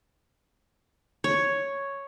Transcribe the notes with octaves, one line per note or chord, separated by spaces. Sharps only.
C#5